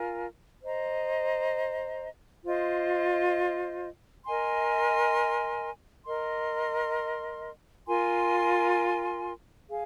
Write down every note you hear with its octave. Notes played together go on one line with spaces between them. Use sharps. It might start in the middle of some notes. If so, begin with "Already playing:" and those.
Already playing: F4 A#4 G#5
C5 D#5 A#5
F4 C5 D#5
A#4 D#5 G#5 C6
A#4 D#5 C6
F4 A#4 G#5 C6
G#4 F5